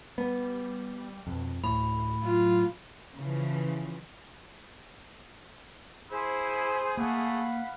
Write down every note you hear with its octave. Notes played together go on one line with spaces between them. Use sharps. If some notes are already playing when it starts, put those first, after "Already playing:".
G3 B3
F2 B2
D2 A2 B5
F#3 F4
C#3 E3 F3
E4 G#4 C5
A3 A#3 F5 F#5 B5